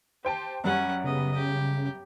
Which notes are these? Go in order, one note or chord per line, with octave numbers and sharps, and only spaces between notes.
G4 C5 G5 A5
F#2 G3 C#4 F#5
C#3 B3 D#5
G4